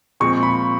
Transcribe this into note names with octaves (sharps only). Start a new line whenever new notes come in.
A#2 F3 G#3 C4 C#6
B5